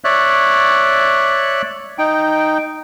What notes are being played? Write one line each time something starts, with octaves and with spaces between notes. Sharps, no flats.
C#5 D5 E5 F#6
D#4 G5